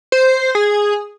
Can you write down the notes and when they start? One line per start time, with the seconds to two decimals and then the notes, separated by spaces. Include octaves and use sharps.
0.12 C5
0.55 G#4